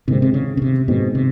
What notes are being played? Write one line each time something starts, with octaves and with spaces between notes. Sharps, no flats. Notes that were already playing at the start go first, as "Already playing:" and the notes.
G#2 C3 D#3 G#3 C4
C3
C#3
C#3
C3
G#2 B2 D#3 G#3 C4
C3